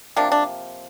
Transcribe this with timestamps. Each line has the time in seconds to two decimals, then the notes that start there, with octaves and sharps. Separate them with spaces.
0.16 C3 F3 A#3 D4
0.32 D4